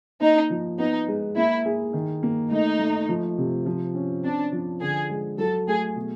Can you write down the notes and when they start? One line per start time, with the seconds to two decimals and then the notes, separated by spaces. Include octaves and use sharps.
0.21 A#3 D#4
0.50 F3
0.79 B3 D#4
1.08 G#3
1.37 A#3 E4
1.66 G#4
1.93 D#3
2.23 A#3
2.51 A3 D#4
2.79 A3
3.09 F3
3.38 C3
3.66 F3
3.95 C#4
4.24 C4 D4
4.52 F3
4.81 D3 G#4
5.09 G#3
5.38 F#3 A4
5.68 A3 G#4
5.96 B2